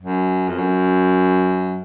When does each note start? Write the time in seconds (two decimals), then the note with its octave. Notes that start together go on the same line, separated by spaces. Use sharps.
0.01 F#2
0.48 F2
0.58 F#2